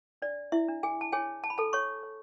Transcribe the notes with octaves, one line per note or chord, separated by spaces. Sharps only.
D4 D5
E4 E5
D4
G#4 G#5
A5
G#4 C#5 G#5
A5
B5
G#4 A4 A5
C#5 C#6
C#5